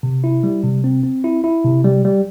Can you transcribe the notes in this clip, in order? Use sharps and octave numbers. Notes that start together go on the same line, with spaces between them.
C3
E4
G3
C3
C4
C4
E4
E4
C3
G3
G3